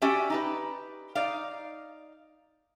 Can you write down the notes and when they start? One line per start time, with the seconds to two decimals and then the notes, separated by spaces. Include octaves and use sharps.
0.02 C#4 F#4 G4 D5 E5
0.30 D#4 G4 B4
1.15 D#4 D5 F5